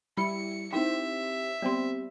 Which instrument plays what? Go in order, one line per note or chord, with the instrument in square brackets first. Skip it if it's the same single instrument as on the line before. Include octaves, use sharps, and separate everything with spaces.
[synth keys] G3 E4 [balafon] B5 [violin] C#7
[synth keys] C4 G4 [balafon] D#4 E4 [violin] E5
[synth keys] G3 C4 [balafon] B3 G4 C6